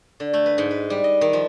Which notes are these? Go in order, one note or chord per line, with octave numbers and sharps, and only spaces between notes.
D3
A3
B4
G#2
B4
G3
D#5
D#3
F3